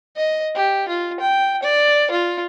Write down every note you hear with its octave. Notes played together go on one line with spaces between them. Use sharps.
D#5
G4
F4
G5
D5
F4